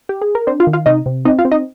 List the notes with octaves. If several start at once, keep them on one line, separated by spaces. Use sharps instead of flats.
G4
G#4
A#4
C4 D4 C5
F4 F5
D#3
F4 F5
C3 D#4 D#5
C3
C4 D#4 D#5
F4 F5
C4
D#4 D#5